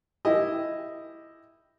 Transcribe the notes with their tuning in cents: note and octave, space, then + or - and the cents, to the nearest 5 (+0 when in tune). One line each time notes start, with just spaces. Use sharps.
E4 +0 G4 +0 D#5 +0